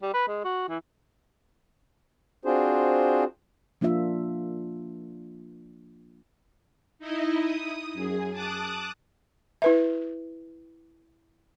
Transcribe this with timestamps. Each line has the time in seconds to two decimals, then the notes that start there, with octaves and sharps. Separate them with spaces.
0.02 G3
0.14 B4
0.27 G#3
0.44 F#4
0.68 E3
2.45 C4 D4 F4 F#4 G#4 C5
3.81 F3 A#3 D4 F4 E5
6.99 D#4 E4 D#5
7.43 D#6
7.93 F#2 G#4
8.32 A5 D6 D#6 F#6
9.62 E4 B4 E5